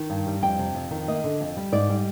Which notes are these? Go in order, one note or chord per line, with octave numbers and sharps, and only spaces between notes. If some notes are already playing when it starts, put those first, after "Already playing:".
Already playing: D#3
G2
G3
F2 G5
C3
F2
D#3
A#3 D#5
D3
F2
G3
G#2 D5
G3